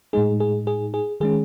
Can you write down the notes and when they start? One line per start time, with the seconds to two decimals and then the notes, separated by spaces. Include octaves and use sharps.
0.13 A2 G#3 D#4 G#4
0.40 G#4
0.67 G#4
0.94 G#4
1.20 D#3 G#3 C#4 G#4